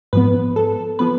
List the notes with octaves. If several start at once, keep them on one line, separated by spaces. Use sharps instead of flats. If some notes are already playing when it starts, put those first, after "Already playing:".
G#2 F3 B3 B4
A4
F3 B3 B4